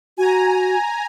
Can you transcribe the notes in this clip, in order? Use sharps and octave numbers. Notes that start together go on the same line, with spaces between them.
F#4 G#5 A#5